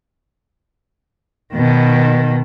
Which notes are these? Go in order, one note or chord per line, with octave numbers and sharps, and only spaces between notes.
B2 D#3